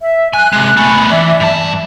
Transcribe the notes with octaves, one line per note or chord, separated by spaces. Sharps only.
E5
G#5 F#6
C3 G#3
A3 B3 G#5 B5
E3 D5 E5
G2 A5